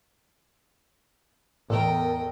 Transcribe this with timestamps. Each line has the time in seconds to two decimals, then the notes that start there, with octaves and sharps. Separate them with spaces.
1.70 E2 A2 A4 A#4 D#5 G5